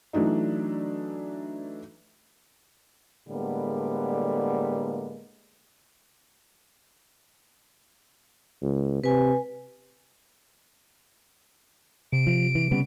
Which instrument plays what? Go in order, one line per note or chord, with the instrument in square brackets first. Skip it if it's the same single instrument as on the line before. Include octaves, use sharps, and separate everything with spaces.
[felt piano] E3 F#3 A3 D4 D#4
[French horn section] A2 D3 G3 G#3 A#3 B3
[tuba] C#2
[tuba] C3 [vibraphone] B4 G#5
[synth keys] C3 [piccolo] D7
[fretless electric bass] F3
E3
C#3 G3 B3